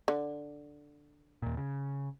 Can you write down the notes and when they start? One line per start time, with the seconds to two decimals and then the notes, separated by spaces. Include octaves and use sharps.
0.08 D3
1.42 D#2 A#2
1.57 C#3